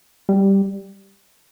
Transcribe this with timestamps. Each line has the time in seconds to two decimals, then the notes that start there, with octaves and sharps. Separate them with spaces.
0.29 G3